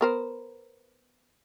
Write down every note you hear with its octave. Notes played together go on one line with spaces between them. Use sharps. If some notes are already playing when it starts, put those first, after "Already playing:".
B3 A#4 C5